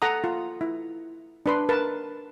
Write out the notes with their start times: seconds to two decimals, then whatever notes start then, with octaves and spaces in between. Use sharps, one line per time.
0.02 A4 F#5 A#5 D#6
0.24 F4
0.61 E4
1.46 D4 B4 C6
1.69 A#4 B4 A5